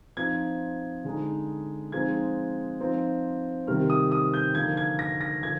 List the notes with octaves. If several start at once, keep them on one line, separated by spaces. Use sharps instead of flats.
F3 C4 D#4 G#6
D3 G#3 D#4
F3 G#3 C4 D#4 G#6
F3 C4 D#4
C3 D#3 G3 C4 F6
D#6
D#6
G6
D3 F3 A#3 D#4 G#6
G#6
A#6
A#6
D3 F3 G#6